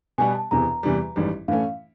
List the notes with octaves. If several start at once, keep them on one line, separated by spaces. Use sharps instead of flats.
B2 G3 B3 G#5
A5
E1 E2 C3 A#5
E2 C3 E3 G3
A1 G#2 D#3 G3
A2 E3 A3 C#4 F5